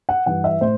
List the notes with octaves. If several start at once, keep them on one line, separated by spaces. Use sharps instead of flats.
F#5
G2 E3 F#5
E5
A2 C5